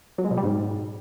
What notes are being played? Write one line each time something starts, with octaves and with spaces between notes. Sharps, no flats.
F#3
G#3
B2
G3
G#2